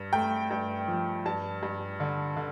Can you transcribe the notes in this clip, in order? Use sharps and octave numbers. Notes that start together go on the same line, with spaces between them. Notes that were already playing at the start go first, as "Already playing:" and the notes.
Already playing: G2
A3 G5
G2
F3
G2 A5
G2
D3
D3